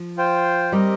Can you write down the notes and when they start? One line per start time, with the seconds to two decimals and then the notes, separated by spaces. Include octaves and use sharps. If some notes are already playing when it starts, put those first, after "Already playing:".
Already playing: F3
0.17 F4 C5 G5
0.72 G3 C4 G4 A#4 D#5